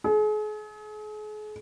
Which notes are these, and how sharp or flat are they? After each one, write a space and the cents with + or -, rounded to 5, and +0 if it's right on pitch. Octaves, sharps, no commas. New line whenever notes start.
G#4 +40